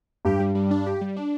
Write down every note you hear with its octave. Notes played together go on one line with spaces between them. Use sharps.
G2 G4
G3
G3
D4
G4
G3
D4